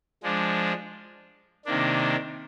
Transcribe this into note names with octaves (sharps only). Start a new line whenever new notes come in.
F3 G#3 D4
C3 D#3 A#3 D4